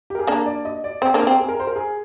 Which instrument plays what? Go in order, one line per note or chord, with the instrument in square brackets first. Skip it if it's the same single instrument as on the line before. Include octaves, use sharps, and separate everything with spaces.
[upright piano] G4
A#4
G#4
[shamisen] A#3 D4 [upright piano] A#4
[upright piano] D5
D#5
D5
[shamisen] C4 [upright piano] C5
[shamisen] A#3 D4
[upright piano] A#4
[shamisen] C4
[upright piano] G#4
A#4
C5
A#4
G#4